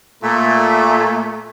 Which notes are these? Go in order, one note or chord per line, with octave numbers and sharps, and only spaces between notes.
A#2 A3